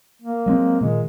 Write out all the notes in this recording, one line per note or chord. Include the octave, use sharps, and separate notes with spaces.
A#3
F#3 G#3 C4
A#2 D#3 G#3